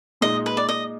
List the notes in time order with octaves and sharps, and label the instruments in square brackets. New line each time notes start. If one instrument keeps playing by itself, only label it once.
[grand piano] A#2 G#3 D#4 [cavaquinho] D#5
[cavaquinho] B4
D5
D#5